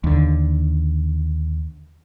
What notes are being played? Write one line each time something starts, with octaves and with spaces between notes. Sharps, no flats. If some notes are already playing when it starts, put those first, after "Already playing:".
D#2 D3